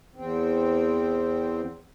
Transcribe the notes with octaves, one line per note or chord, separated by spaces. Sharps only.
E2 C4